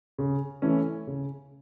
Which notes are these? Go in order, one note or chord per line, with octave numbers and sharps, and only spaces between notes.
C#3
E3 A3 C#4
C#3